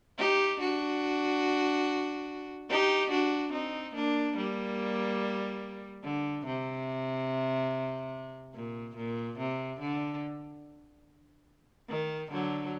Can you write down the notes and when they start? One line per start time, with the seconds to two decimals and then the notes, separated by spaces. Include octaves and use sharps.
0.18 D#4 G4
0.60 D4 F#4
2.69 D#4 G4
3.11 D4 F#4
3.53 C4 D#4
3.95 A#3 D4
4.36 G3 A#3
6.03 D3
6.45 C3
8.55 A#2
8.96 A#2
9.39 C3
9.80 D3
11.89 D#3
12.31 D3 F#3